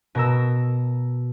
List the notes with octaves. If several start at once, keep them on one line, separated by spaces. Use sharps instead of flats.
B2 A#4 A#5 E6